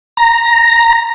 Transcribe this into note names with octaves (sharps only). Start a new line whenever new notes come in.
A#5